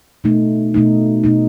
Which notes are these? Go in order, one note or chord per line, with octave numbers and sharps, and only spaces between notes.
B2 A3 D#4
B2 A3 D#4
B2 A3 D#4